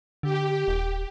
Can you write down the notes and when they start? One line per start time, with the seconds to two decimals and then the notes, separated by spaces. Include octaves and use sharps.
0.23 D3 G4
0.68 D#1